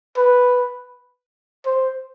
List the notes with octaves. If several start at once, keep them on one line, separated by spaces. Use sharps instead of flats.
B4
C5